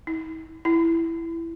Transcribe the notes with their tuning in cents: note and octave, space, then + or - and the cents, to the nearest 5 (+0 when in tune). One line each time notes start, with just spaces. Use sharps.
E4 -40
E4 +10